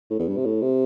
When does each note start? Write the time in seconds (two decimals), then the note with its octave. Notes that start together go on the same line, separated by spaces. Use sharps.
0.10 A2
0.19 E2
0.28 G2
0.37 C3
0.45 A2
0.62 C3